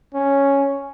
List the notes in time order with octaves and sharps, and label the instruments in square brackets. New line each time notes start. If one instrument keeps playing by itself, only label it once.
[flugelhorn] C#4